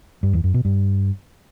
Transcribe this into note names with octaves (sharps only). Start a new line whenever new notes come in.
G2
E2
F#2
B2
G2